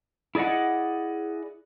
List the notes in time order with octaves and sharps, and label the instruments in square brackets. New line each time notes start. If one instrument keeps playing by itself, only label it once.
[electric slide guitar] E4 G#4 D5 D#5 F#5